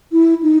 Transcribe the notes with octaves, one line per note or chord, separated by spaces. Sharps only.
E4
D#4